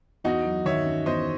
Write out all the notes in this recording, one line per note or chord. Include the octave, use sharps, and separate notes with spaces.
E2 D#4 F#4
F#3
D#3 C#5 E5
C#4
E2 C5 D#5